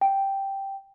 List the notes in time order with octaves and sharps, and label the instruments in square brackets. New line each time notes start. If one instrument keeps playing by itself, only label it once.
[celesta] G5